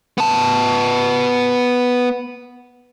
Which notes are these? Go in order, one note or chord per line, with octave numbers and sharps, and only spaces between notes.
B3 A5